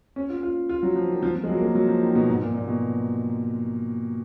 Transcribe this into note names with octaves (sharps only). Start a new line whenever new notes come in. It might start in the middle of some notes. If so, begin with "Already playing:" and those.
C#4
F4
F4
F4
F#3
F3
D#3
F3
F3
G#3
F#3
A#3
G#3
F#3
F3
D#3
B2
G#2
A#2
A#2
B2